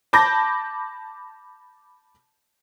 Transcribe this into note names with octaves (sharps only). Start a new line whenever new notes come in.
A5 B5 D6 G6 A#6